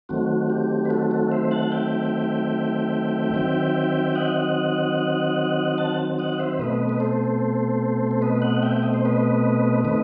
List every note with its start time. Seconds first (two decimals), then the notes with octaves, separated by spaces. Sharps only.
0.09 D#3 F#3 A3 C4 F#4
0.50 G4
0.85 B4
0.90 F#4 A4
1.11 F#4 A4
1.32 C5 E5
1.51 F#5 A5
1.63 A5
1.72 E5 G5
3.34 D#3 F#3 C4
4.15 D#5 F#5
5.78 F#5 A5
6.19 D#5 F#5
6.33 D#5
6.39 C5 E5
6.59 B2 A3 C4 B4 D#5
6.89 B4
7.00 A4 C5
8.11 C5
8.22 B4 D#5
8.42 D#5 F#5
8.63 E5 G5
8.83 D#5
8.94 C5
9.05 B4 D#5
9.85 D#3 A3 C4 B4 D#5